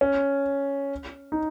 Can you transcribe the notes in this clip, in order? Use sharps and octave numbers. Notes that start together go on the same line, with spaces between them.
C#4
D#4